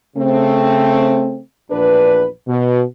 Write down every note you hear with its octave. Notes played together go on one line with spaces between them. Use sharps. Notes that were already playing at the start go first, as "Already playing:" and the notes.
C#3 A3 C4
A#1 E2 D4 B4
B2